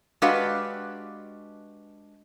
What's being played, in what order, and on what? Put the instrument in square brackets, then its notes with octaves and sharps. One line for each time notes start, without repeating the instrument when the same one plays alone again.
[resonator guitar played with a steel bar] G#3 D4 F#4 G4 B4 F5